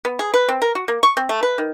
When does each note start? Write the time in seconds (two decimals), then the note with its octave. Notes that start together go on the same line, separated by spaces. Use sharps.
0.05 B3
0.19 G#4
0.34 B4
0.49 C4
0.62 A#4
0.75 F#4
0.88 A#3
1.03 C#6
1.17 C4
1.29 A3
1.43 B4
1.58 D#3